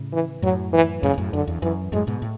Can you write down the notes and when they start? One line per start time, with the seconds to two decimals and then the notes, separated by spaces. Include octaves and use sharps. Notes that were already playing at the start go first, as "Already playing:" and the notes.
Already playing: A2 C#3
0.13 E3
0.42 F#2 A2 F#3
0.73 E3
1.03 F#2 A2 C#3
1.14 B2
1.18 F#2 A2
1.33 F#2 D3
1.47 E2
1.62 F#2 E3
1.92 F#2 A2 G#3
2.07 G#2 B2
2.22 A2